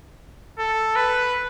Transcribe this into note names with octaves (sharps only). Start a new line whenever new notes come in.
A4
B4